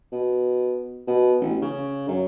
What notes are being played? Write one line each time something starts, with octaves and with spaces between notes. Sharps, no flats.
B2
B2
A1
C#3
F#2